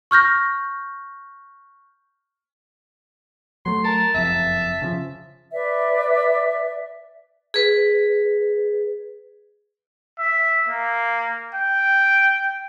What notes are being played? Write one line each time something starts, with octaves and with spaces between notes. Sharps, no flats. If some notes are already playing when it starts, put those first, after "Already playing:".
C#6 F6 G6 A#6
F#3 A3 C6
A#4 A5
F#1 F2 E5
C#3 F3
B4 D5 E5
G#4 B4
E5
A#3
G5